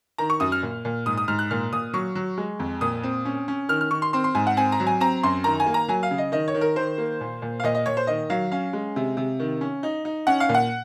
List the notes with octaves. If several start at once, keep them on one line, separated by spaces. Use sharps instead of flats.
D#3 A#5
C#6
F#2 D#6
F6
A#2
A#2
G#2 D#6
D#6
G#2 F6
F#6
A#2 F6
A#2 D#6
F#3 C#6
F#3
G#3
F2
A#2 D#6
C4
C#4
C#4
D#3 F6
F6
D#3 C#6
C6
C4 C6
C6
G#2 G#5
F#5
C4 G#5
A#5
F#3
G#5
C4 A#5
F#2 C6
D#3 A#5
G#5
A#3
A#5
F#3 G#5
F5
C#3
D#5
D#3 D#5
C#5
D#3
A#4
D#3 C5
A#3
A#2
A#2
F5
A#2 D#5
D#5
A#2 C#5
C5
D#3 D#5
F#3 F5
C#4 F5
G#3
C3
C3
D#3
C#4
D#4
D#4
C#4 F#5
F5
A#2
F#5